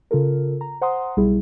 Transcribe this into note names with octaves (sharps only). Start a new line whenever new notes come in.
C#3 F4 A4 A#4
A#5
C5 F#5 A#5 C6 D#6
B1 G3 E4 G#4